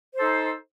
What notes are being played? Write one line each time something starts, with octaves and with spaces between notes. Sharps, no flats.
D#4 A4 C5